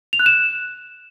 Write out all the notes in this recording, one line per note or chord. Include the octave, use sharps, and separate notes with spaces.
F7
F#6
E7